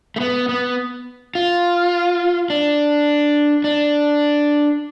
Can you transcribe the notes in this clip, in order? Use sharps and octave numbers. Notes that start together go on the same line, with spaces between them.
A3
B3
B3
F4
D4
D4